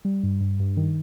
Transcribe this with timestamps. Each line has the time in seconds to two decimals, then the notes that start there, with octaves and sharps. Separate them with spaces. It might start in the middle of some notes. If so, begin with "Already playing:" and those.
0.05 G3
0.23 G2
0.41 G2
0.59 G2
0.77 D#3